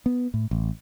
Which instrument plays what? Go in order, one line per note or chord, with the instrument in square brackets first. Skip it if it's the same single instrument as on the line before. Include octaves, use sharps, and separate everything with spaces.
[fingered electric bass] B3
A2
A1